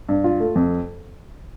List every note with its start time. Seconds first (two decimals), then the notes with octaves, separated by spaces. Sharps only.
0.09 G2
0.24 F4
0.40 A3
0.56 F2